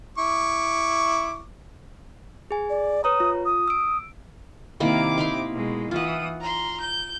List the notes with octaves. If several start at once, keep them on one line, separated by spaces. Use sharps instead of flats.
E4 C#6 D6
G#4 G#5
D5
B4 C#5 A#5 D#6
F4
D#6
E6 D7
C3 D#3 A#3 E4 D6
D#4 E4 C6
B2 G#3
E3 F4 F#5 D#6
A#5 C6
G6